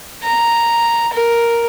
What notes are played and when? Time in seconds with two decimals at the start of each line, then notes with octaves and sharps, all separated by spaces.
0.24 A#5
1.13 A#4